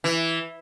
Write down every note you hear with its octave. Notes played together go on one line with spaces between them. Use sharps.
E3